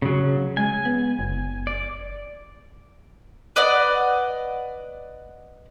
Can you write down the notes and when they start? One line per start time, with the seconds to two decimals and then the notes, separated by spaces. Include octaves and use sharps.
0.02 C#3 F#3
0.57 G#3 G#5
0.85 B3
1.19 F#1
1.67 D5
3.56 B4 D5 D#5 F#5